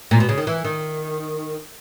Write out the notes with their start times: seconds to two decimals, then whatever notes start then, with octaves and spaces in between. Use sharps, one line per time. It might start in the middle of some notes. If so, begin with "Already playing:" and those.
0.11 A#2
0.20 B2
0.29 C#3
0.38 D#3
0.47 E3
0.65 D#3